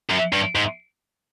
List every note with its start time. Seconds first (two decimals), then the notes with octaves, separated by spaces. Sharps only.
0.10 F#2
0.33 G2
0.55 G#2